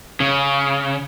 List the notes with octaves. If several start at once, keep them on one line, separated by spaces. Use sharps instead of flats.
C#3